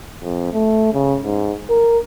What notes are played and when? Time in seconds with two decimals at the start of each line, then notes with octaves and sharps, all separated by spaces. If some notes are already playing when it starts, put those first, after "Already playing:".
0.23 F2
0.53 A3
0.93 C#3
1.25 G#2
1.70 A#4